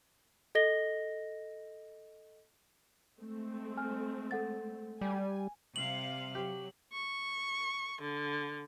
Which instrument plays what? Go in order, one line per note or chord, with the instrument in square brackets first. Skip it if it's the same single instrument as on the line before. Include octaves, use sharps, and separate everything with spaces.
[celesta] A4 D#5 A#6 G7
[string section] G#3 A3 C4
[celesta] G#5 F6
A4 F#5 A6
[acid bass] G3 [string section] G#5
[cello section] C3 G3 F5 [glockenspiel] F#7
[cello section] F#3 [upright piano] G4
[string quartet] C#6
D3